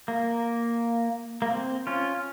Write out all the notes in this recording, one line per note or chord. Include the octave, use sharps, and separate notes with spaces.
A#3
A#3
C4
C#4 F4